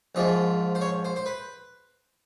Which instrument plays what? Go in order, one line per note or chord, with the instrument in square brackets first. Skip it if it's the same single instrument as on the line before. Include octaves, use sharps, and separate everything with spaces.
[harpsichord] A#1 G#2 F3 G#3 D#5
C5
C#5
C5
C5
B4